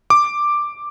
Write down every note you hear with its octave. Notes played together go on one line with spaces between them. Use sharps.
D6